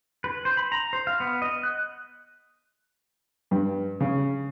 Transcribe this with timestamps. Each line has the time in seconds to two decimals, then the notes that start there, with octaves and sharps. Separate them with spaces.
0.24 B4
0.45 C5
0.57 B5
0.72 A#5
0.93 C5
1.07 F5
1.20 B3
1.42 D#5
1.63 F#6
3.51 G2
4.00 C#3